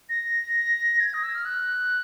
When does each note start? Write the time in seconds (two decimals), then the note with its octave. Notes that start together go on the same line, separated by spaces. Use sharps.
0.09 A#6
1.00 G#6
1.14 D#6
1.23 E6
1.35 F6
1.45 F#6